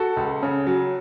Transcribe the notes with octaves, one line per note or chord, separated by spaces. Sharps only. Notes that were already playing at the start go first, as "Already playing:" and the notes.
Already playing: F#4 A4
C#2
C#3
F#3